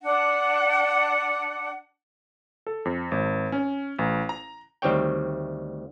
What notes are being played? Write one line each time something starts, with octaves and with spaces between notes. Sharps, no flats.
D4 F#5
A4
F2
G#1
C#4
A1
A#5
D2 D#3 G3 C4 C#5 G5